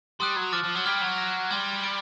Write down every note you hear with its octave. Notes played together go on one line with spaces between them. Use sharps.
G3 C6 D#6 F#6
F#3
F3 D6 F6 A6
F3
F#3
G3 F6 G#6 B6 D7
F#3
F#6 A#6 D7
G3 C6 F6 G#6
A6 D7